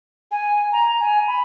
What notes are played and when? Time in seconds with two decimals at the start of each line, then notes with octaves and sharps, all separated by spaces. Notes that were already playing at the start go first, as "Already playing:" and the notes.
0.31 G#5
0.72 A#5
1.00 G#5
1.28 B5